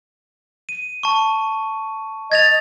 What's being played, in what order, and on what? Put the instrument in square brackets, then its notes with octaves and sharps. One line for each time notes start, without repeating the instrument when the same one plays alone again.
[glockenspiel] D#7
A5 C#6
[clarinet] D#5 [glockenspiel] G#6 A6 F7